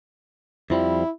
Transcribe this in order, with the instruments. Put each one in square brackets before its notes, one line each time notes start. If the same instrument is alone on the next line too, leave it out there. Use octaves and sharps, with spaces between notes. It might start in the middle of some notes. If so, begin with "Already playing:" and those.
[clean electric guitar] F2 F3 G3 [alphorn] E4